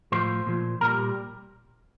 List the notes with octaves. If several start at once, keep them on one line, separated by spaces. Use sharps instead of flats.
A2 F3 C5
A#2 F3
A#2 G3 A#4